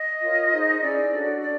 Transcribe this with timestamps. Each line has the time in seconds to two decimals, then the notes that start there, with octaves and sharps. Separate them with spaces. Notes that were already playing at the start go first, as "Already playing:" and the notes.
Already playing: D#5
0.22 F4 A#4 C#5
0.52 D#4 G#4 C5
0.83 C#4 E4 G#4 D5
1.13 D4 F#4 A4 C#5
1.42 D4 D5